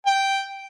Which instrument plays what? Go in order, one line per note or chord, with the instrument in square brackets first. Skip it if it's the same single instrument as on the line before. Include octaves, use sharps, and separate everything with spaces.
[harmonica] G5